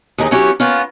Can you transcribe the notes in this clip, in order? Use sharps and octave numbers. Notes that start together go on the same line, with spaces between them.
D#2 D#4 G#4
F#3 B3 C#4 E4 G4
A#3 B3 C#4 F4